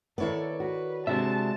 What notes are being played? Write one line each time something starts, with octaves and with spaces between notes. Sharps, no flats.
D#3 B3 E4 A4 C#5 D5
F#4 B4
C3 G#3 D4 F#4 E5 A5